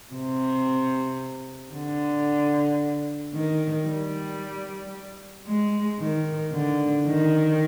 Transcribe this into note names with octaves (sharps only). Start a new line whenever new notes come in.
C3
D3
D#3
G3
G#3
D#3
D3
D#3